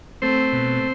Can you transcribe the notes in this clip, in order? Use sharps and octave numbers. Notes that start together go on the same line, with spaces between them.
A3 C4 C5
B2